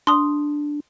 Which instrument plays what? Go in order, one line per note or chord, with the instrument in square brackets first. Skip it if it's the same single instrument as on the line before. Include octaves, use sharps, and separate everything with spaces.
[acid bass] D4 [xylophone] C6 D#6